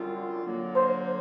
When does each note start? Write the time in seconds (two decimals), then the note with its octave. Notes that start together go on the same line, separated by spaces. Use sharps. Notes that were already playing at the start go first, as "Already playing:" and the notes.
Already playing: F#2 D3 G3 C4 F4
0.42 D3 F#3 A#3
0.76 C5